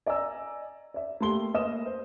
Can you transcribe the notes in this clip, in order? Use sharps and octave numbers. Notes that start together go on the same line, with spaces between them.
D5 D#5 G#5 A#5 E6
D5 E5
A3 A#3 G4 C6 G7
A#3 B4 D#5 D#6 E7
C5